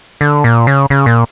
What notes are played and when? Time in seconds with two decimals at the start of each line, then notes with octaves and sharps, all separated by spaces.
0.21 D3
0.44 A#2
0.67 C#3
0.90 C#3
1.06 A#2